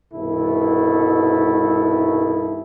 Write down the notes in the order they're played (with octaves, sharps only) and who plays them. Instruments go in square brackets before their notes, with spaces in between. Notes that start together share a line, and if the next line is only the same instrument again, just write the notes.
[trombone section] C2 G2 B2 D#3 E4 A4